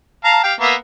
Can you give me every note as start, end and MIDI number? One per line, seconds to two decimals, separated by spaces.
0.24 0.40 77
0.24 0.40 81
0.24 0.40 82
0.44 0.54 67
0.44 0.54 77
0.44 0.54 79
0.61 0.75 58
0.61 0.75 59
0.61 0.75 76